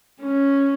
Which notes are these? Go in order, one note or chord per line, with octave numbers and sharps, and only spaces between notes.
C#4